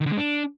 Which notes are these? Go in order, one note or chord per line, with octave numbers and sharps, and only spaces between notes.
D#3
D3
G#3
D4